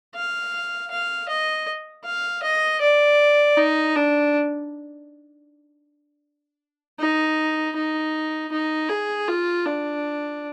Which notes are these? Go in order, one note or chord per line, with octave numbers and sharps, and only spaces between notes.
F5
F5
D#5
F5
D#5
D5
D#4
D4
D#4
D#4
D#4
G#4
F4
D4